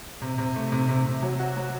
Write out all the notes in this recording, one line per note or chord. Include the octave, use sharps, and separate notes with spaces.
C3
C3
A3
C3
C3
C3
F#3
F#4
F#3